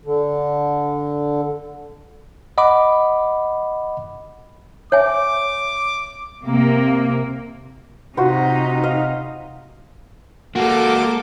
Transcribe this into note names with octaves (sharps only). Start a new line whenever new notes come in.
D3
D#5 F#5 B5 D6
C#5 E5 G#5 D6
C3 A#3
C3 D#4 F4 F#4 C5
D#5 F5
G#3 A#3 F#4 A4 D6